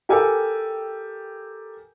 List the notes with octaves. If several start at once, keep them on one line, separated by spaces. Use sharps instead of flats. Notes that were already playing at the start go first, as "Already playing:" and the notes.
G4 A4 A#4 G5 G#5